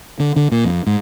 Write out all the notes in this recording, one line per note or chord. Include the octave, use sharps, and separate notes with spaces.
D3
D3
A#2
F2
G#2